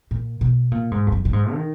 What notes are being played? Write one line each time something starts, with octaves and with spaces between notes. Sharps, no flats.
A#2
B2
A#2
G#2
F2
F#2
A#2
G#2
D#3